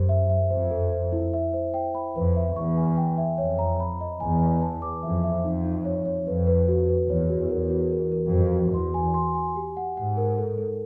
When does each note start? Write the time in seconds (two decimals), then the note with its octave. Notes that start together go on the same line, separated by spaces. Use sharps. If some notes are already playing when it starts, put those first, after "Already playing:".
Already playing: F#2 G4 C5
0.09 E5
0.30 E5
0.50 F2 C5
0.71 A4
0.92 C5
1.12 E4
1.34 E5
1.53 C5
1.74 G5
1.95 B5
2.15 F2 B4
2.36 E5
2.56 E2 C#6
2.78 G#5
2.97 G5
3.18 E5
3.38 F2 C#5
3.59 A#5
3.80 B5
4.01 D#5
4.20 E2 G#5
4.42 G#5
4.62 A5
4.82 D6
5.03 F2 E5
5.24 E5
5.44 F2 D#4
5.65 D#4
5.85 C#5
6.05 C#5
6.27 F2 B4
6.47 B4
6.68 F#4
6.89 B4
7.09 E2 C#5
7.29 F#4
7.49 E2 A#4
7.70 F#4
7.92 A#4
8.12 A#4
8.32 F2 F#4
8.53 F#4
8.73 E2 C6
8.94 G#5
9.14 C6
9.35 G#5
9.56 G4
9.77 F#5
9.97 G#2 F#5
10.17 A#4
10.38 A4
10.58 A4